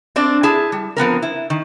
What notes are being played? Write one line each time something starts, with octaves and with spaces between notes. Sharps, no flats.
C4 D4 D5
E4 G#4 A5
G3
F3 B3 C4 A#4
E4
D#3